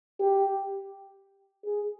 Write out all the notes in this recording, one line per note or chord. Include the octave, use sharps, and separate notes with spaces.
G4
G#4